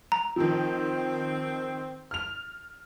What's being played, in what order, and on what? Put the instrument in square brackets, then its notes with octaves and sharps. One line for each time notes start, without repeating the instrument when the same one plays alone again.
[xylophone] A#5
[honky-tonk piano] D#3 F3 [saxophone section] C4
[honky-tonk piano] F6 F7